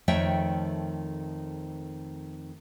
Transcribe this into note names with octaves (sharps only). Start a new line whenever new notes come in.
F2 D#3 A3 C#5 E5 G5